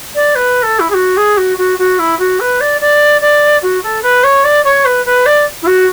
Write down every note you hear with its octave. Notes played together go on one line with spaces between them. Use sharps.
D5
B4
A4
E4
G#4
F#4
G#4
F#4
F#4
F#4
E4
F#4
B4
D5
D5
D5
F#4
A4
B4
C#5
D5
C#5
B4
B4
D5
E4
F#4